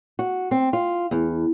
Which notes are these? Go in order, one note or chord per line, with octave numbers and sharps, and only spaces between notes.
F#4
C4
F4
E2